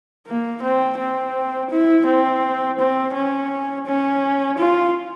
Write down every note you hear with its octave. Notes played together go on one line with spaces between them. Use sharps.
A#3
C4
C4
E4
C4
C4
C#4
C#4
F4